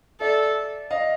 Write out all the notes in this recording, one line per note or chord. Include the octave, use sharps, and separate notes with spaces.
A4 D5 E5
D#5 F5